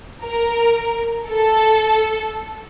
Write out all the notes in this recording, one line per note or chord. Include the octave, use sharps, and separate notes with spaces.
A#4
A4